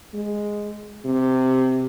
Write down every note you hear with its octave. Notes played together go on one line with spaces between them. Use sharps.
G#3
C3